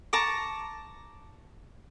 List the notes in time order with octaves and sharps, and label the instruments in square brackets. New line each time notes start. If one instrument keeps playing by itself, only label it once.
[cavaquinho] A5 A#5 C#6 D6